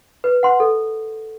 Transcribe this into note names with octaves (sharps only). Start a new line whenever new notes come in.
B4
F#5 C6
A4